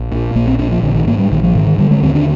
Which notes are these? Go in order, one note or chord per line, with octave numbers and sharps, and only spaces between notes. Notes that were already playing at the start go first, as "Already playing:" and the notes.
Already playing: A#1
A#2
A#1 A#3
C4
A#2 D4
F3
A#1 D3
D#3
G#2 A#3
G3
A#1 D#3
F3
G#2 D#3
D#3
D3 G3
G#3
D#2 C4
D4